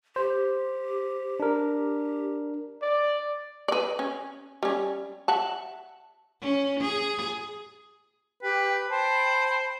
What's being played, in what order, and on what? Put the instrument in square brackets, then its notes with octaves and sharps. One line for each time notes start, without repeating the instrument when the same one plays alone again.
[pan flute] G4 [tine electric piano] C5
[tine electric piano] D4 A#4
[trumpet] D5
[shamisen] B4 D5
C#4
G3 C#4
E5 F#5 A5
[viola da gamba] C#4
G#4
[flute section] G4 G5 [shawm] B4
[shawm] C5 [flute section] G5 A5 B5